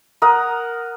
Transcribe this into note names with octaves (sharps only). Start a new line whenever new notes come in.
A#4 F#5 D#6